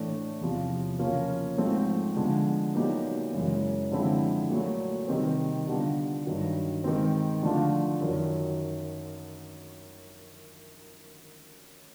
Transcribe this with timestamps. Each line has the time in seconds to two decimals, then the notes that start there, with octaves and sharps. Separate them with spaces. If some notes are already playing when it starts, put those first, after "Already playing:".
Already playing: A2 E3 A3 D4
0.41 E2 C3 F3
0.99 C#3 F3 A#3 C#4 F4
1.58 G#2 F3 A3 C4
2.17 D3 F3 G#3 B3
2.75 A#2 F#3 B3 D#4 G4
3.33 F#2 C#3 E3 G#3
3.92 D3 F3 G#3 C4 E4
4.50 A#2 F#3 A3
5.08 C3 D#3 G3 C4
5.67 D3 G3 B3 D4 F4
6.25 G2 D#3 F#3
6.84 D#3 G#3 C4
7.43 D3 F3 A3 D4 F4
8.01 F#2 D#3 F#3